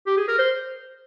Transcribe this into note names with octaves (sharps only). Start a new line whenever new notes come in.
G4
G#4
A#4
C5